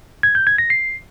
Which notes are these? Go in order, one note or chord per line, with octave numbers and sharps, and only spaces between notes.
G#6
G6
G#6
A#6
C7